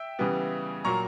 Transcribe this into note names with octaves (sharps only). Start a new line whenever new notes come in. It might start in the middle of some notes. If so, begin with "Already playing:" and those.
Already playing: E5 G5
C#3 E3 G3 B3
A#2 F#3 A#3 A#5 C#6